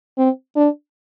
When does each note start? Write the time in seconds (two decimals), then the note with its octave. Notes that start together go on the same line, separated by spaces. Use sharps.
0.18 C4
0.56 D4